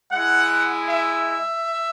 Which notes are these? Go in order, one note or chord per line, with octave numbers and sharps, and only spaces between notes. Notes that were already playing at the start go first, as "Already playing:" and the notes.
G#3 E4 F#5
E5